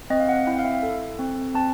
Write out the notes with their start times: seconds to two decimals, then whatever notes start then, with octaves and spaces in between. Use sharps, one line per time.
0.10 C4 D#5
0.20 F5
0.29 F#5
0.47 E4 G5
0.59 F5
0.65 E5
0.83 A4
1.19 C4
1.54 C4 A5